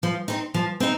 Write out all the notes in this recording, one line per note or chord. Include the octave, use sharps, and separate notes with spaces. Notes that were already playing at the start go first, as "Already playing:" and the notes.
F3
C4 D#4
F3
C4 D#4